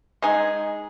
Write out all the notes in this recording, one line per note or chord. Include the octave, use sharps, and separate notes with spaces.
G#3 D#4 G#4